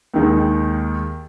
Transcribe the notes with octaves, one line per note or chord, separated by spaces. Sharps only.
D#2 D#3 G#3